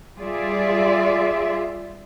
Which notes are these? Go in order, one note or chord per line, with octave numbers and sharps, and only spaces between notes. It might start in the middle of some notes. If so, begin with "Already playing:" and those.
G3 F4 G#4 D5 E5